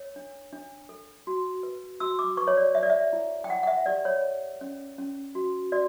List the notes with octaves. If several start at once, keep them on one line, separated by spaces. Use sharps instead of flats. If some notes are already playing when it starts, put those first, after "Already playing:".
Already playing: C#5
D4
D4
A4
F#4
B4
F#4 E6
D6
B4 C#6
C#5
D5
C#5 E5
D5
E5
E4
G5
E4 F#5
F#5
E5
G4 D5
C#5
C#5
C#4
C#4
F#4
F#4 D5